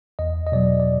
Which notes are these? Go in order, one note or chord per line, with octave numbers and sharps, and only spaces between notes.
E2 D#5
D#5
B2 F#3 D5
D5